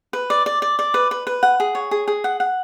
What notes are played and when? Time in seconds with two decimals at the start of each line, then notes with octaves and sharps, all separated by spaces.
0.13 B4
0.30 D5
0.46 D5
0.62 D5
0.79 D5
0.94 B4
1.11 B4
1.27 B4
1.43 F#5
1.60 G#4
1.75 C#5
1.91 G#4
2.08 G#4
2.24 F#5
2.40 F#5